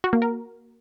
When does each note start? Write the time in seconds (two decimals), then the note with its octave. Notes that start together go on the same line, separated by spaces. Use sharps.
0.04 F#4
0.13 A#3
0.22 A#4